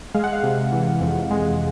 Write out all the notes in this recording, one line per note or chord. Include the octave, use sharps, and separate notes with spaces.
G#3 F5
F#5
F5
C3
E3
F2
G#3